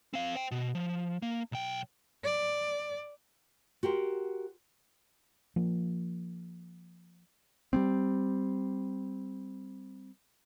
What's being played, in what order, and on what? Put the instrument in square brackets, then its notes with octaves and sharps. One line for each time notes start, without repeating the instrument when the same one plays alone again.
[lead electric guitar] C4 F5
C5 G5
B2
F3
A#3
B1 G5
[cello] D5
[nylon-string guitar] F#4 G4 A#4 C5
[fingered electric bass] F3 A#3
[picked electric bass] G3 B3 C4